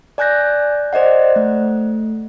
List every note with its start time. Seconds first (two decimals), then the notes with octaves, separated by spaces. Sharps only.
0.18 D5 G#5 F#6 G6 A#6
0.93 C5 D5 D#5 F#5
1.36 A3